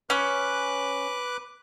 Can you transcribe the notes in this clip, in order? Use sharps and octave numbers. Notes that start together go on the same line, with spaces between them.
C#4 B4 D6 F#6